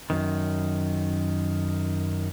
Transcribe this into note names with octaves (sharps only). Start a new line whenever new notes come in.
F#2 D#3